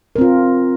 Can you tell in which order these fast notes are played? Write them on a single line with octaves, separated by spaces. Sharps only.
A#4 C4 F4